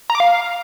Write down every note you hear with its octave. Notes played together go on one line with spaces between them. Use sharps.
A#5
D6
F5